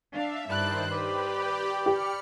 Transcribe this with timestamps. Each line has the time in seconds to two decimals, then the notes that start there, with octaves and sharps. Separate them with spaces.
0.13 D4 E5 F5
0.50 G2 D#3 E4 C5 D5 A5 F#6
0.91 G4 B4 D5 B5
1.86 G4 F6 C#7